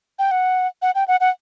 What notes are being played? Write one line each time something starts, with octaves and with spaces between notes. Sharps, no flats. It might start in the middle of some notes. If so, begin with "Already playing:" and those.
G5
F#5
F#5
G5
F#5
F#5